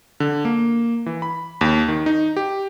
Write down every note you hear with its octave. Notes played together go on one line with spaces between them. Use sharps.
D3
A#3
E3
B5
D#2
D#3
D#4
G4